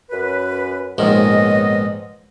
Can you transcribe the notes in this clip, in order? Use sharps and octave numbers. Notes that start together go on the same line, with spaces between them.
F#2 B4
A#1 G#2 D#3 B3 C#4 D#5